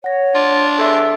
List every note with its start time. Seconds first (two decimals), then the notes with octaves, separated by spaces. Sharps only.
0.04 C#5 F#5 A#6
0.35 D4 F4
0.79 E2 A4 E5 E6